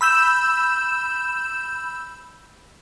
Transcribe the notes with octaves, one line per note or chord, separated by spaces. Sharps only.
B5 E6 G6 E7